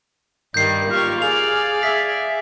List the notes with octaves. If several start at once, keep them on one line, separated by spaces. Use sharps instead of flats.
G2 D#3 G3 G6 C7
A#3 F4 G4 C#6 F6
G#4 D5 F5 F7
G#4 E5 B6